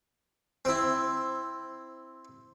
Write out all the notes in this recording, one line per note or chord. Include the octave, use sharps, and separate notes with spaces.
C4 E4